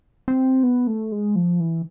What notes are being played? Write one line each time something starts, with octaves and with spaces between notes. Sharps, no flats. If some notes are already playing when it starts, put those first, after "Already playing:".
C4
B3
A3
G#3
F3
E3